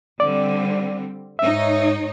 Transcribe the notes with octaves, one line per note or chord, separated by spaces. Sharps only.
D3 G3 C4 D5
G#2 D#4 C#5 E5